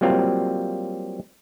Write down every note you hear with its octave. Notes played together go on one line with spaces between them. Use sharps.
F#3 G3 A#3 C4 F4